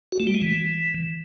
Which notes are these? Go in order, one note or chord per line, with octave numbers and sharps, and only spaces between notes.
F#4
A3
G3
G#3
E3